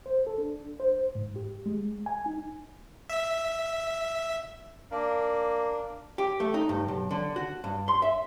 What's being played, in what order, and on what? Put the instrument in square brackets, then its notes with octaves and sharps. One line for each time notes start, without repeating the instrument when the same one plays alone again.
[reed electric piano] C5
A4
D4
C5
G#2
G4
G#3
G#5
D#4
[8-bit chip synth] E5
[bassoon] A#3 [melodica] D4
[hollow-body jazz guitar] G4
A3
D#4
G2
B1
D3
F#4
G2
C6
E5